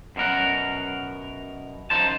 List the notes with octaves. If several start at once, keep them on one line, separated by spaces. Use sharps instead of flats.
F#2 B2 A#4 F#5
F#2 D#4 C5 A5